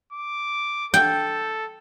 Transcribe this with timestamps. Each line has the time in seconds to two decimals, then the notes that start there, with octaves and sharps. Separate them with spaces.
0.13 D6
0.94 A4 G5